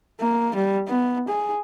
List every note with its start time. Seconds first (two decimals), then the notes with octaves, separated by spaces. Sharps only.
0.20 A#3
0.55 G3
0.88 B3
1.28 G#4